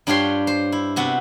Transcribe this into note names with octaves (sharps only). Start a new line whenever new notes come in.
G2 D4 F4 G4 C#5 C6
C5
E4
C3 B3 F#4